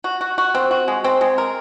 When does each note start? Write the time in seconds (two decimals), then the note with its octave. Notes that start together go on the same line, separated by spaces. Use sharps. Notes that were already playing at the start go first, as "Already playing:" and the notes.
0.04 F#4
0.21 F#4
0.38 F#4
0.55 C4
0.71 F#4
0.88 G#3
1.04 C4
1.21 G#3
1.38 A#4